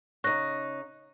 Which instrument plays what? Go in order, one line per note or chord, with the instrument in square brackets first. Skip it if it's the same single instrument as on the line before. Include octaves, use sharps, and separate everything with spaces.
[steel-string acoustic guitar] C#3 D#4 [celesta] C#6 F#6 A#6